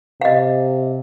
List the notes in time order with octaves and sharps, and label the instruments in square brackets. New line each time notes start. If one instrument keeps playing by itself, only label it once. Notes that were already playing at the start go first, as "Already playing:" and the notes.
[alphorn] C3 [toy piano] D#5 F5